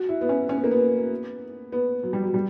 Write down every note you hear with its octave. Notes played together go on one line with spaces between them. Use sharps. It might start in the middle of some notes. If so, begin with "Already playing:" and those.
Already playing: F#4
E4
B3
C#4
C#4
B3
A#3
B3
B3
F#3
G3
F#3
G3